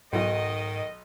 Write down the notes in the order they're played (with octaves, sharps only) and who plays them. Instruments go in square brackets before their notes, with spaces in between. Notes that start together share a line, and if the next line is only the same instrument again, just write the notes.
[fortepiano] B1 F#4 [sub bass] G#2 [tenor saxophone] D#3 [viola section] D#5